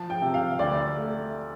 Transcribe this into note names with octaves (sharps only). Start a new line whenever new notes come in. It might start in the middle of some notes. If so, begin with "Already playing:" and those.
Already playing: F3 A5
G5
C3
F5
D2 D5
A3